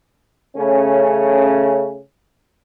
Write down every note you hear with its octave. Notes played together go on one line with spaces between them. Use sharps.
C#3 A3 C#4